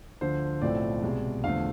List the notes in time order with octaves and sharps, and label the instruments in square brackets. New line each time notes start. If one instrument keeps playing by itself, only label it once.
[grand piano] D2 D3 F3 C5
B1 A2 F3 A3 C4 D5
C2 B2 G#3
E2 D3 F3 A3 F5